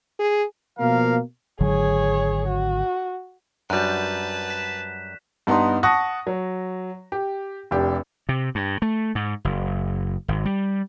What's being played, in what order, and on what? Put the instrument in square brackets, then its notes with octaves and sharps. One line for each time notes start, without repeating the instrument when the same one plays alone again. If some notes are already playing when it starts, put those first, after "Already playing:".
[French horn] G#4
[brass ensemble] B2 F3 A#3 A#4 F5
[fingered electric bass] G#1 D3 F#3 [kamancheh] G#4 C#5
[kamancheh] F#4
[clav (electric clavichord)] F#2 G3 [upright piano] D4 F#4 [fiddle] B4 A5 [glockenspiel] F#6 G6
[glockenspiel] F#6 B6 E7
[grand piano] G2 B3 D#4 A#5 C6
F#5 A5 C#6 D#6 A#6
F#3
G4
F1 D4 G4
[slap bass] C3
G2
A3
G#2
F#1
G#1
G3